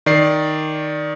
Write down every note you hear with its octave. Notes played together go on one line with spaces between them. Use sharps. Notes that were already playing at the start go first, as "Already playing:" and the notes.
D#3 D5 C7